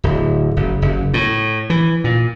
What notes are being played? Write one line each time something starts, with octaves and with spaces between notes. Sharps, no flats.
D1
F#1
F#1
A2
E3
A#2